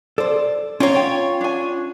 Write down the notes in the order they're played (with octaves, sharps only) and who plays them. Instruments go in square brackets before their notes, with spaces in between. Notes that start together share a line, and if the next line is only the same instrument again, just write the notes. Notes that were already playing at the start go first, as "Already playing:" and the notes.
[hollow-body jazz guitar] A4 C5 [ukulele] D5
[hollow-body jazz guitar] C#4 G5 A#5 [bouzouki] F4 C#5
[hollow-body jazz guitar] C#4 [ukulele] G5
[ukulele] D4 G#5